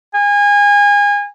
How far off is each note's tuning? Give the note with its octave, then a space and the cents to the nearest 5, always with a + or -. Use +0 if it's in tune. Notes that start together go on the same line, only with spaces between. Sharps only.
G#5 -30